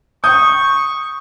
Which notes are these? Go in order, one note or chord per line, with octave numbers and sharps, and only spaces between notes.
C#6 D#6 G6